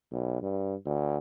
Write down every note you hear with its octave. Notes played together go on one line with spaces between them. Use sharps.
B1
G2
D2